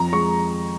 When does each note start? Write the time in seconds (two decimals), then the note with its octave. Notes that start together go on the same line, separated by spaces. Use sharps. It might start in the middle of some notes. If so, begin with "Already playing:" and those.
Already playing: F2 A#5
0.12 G#3 C#6